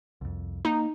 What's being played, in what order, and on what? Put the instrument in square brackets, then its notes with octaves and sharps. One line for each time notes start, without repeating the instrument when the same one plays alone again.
[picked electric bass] C2 F2
[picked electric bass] A#3 [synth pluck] D#4